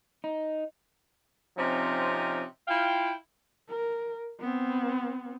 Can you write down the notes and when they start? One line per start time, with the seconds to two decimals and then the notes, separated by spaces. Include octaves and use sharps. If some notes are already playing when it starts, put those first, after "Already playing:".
0.24 D#4
1.57 C3 F3 C4 C#4 D#4
2.68 E4 F4 F5 G5
3.69 A#4
4.40 B3 C4